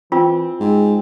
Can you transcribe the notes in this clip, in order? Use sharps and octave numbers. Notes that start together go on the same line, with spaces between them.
E3 C4 F4
G#2 G#4